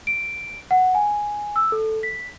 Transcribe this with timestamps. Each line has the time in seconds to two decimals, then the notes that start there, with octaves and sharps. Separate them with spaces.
0.07 D7
0.71 F#5
0.95 G#5
1.56 E6
1.72 A4
2.03 B6